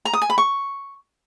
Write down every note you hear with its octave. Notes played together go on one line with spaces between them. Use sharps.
A#5
D#6
G#5
B5
C#6